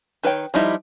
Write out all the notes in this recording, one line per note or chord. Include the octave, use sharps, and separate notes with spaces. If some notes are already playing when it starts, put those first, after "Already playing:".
D#3 B4 C#5 G5
F3 G3 D#4 E4